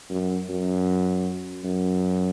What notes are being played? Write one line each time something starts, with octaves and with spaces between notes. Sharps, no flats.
F#2
F#2
F#2